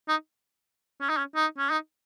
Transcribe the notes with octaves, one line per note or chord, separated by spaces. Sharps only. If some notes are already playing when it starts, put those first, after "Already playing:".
D#4
C#4
D#4
C#4
D#4
C#4
D#4